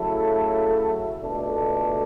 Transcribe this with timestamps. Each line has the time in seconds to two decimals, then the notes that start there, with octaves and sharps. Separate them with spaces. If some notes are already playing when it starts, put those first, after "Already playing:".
Already playing: C#3 F#3 A3 E4 A4
1.23 C#2 B2 A3 D4 A4